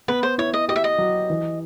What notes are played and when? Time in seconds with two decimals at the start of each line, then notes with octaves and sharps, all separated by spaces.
0.08 B3 B4
0.23 C5
0.38 E4 C#5
0.54 D#5
0.68 G4 D#5
0.76 E5
0.84 D#5
0.98 F#3
1.30 E3